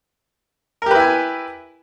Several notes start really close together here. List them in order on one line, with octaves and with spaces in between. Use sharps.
A#4 G4 B4 E4 G#5